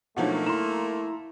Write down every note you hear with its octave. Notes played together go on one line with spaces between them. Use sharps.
B2 F3 F#3 A3 A#3 D4 D#4 F#5
E4 A#5 C6 E7